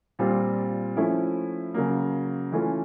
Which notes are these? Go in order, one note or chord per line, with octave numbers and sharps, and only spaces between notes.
A#2 G3 C4 F4
F3 A3 C#4 E4
C#3 F#3 A#3
E3 A3 C#4 F4